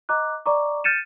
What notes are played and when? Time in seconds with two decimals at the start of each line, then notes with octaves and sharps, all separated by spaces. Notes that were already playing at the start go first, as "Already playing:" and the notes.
0.09 D#5 A#5 D6 F#6
0.46 D5 D#5 A#5 C#6 D6
0.84 F6 G6 A6 C#7 D#7 E7